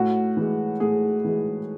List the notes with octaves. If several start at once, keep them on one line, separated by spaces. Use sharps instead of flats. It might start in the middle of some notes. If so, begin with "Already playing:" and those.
Already playing: A2 F#4
E3 G#3
A2 G#4
E3 G#3